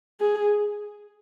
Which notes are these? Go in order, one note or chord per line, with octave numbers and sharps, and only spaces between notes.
G#4